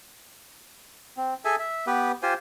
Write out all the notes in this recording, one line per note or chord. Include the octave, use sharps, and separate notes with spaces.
C4
G#4 A4 E5 G#5
E5
B3 G4 B4
F4 G4 C5 G#5